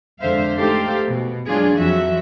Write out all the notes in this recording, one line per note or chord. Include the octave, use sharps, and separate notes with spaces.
F2 D3 G#3 C5 E5 F5
A3 D#4 G4 A4 C5 F5
B2
F#3 G#3 D4 F4 G#4
F2 F3 F#3 F#4 E5